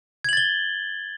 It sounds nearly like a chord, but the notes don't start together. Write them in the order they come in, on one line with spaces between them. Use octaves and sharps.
G#6 F#7 A6 G7